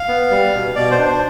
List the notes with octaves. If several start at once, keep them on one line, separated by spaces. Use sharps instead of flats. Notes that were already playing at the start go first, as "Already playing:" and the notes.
Already playing: F5
B3
G3
B2
B2 D5
C5
D4
C5